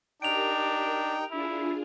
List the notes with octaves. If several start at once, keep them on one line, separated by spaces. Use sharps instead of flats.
D4 D#4 G4 A#4 G5 D7 F7
D4 E4 F4 G#4